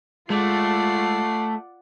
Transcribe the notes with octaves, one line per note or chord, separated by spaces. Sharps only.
G#3 A3 F4 D5 F#5 C7